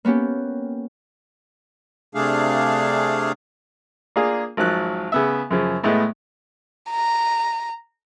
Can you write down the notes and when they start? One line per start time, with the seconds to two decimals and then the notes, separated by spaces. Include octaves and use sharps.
0.05 A#3 B3 C#4 G4
2.15 C3 A3 D4 G#4 F5
4.16 A#3 D4 F4 G#4
4.57 G#1 F3 F#3 F#6
5.12 C#3 B3 E5
5.51 F#2 C#3 F3
5.84 A2 G#3 A3 B3
6.90 A#5